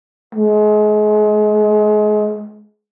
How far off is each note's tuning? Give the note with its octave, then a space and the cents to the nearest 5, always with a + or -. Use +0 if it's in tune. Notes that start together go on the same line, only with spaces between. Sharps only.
G#3 +30